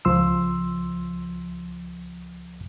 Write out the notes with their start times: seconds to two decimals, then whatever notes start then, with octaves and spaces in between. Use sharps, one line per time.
0.05 C#2 F3 C6 E6